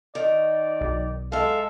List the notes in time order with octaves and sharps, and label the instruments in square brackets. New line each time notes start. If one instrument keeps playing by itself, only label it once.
[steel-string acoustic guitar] D#3 [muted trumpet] D5
[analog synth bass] B1
[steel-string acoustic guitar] G#3 E5 [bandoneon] A4 F5